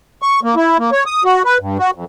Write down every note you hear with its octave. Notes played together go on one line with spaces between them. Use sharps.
C#6
A#3
E4
A#3
C#5
D#6
F#4
B4
G2
F#4
F2